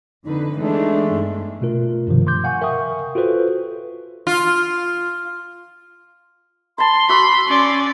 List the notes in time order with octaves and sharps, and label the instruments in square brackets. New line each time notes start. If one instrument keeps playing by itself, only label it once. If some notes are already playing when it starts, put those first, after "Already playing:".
[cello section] F2 D3 B4 [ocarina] D#4
[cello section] E3 B3 D4 [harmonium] G#3 A3
[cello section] G2
[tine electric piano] B2 A3 F4 A#4
G2 C3 D#3 F3
C6 D6 G6
F5 F#5 G#5 C#6
A#4 E5 F5 G5 C#6 D#6
F4 F#4 A4 B4 C5
[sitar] F4
[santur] A5 B5 [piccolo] C6
[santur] F#4 E6 [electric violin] B5
[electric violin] C#4 D5